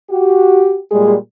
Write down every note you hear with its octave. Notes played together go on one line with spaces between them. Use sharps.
F#4 G4
A#2 G3 G#3 G#4